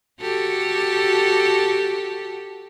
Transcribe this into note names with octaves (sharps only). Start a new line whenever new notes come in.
F#4 G4 A4